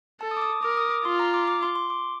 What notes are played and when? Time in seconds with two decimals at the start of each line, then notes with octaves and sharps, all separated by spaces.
0.20 A4 A5
0.31 D#6
0.37 D6
0.42 D#6
0.53 D#6
0.62 A#4 D6
0.77 D#6
0.91 D6
1.05 F4 C6
1.19 A#5
1.34 D6
1.48 D6
1.63 C6
1.75 C6
1.90 D6